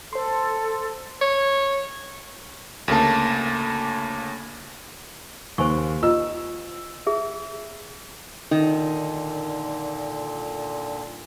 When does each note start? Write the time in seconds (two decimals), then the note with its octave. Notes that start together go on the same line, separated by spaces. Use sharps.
0.13 A4 C5 C6
1.22 C#5
2.88 D2 C#3 A#3 A5
5.58 D#2 C5 G#5 C#6
6.03 F4 D#5 E6
7.07 G#4 E5
8.51 A#2 D3 D#3 D#4